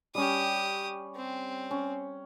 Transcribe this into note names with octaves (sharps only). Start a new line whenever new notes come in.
G3 C#4 G4 D#6
C4
C#4